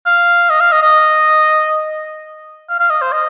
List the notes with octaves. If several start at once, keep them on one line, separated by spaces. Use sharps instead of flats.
F5
D#5
F5
D#5
D#5
F5
F5
D#5
C5
D#5